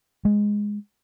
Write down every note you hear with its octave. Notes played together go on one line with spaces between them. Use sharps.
G#3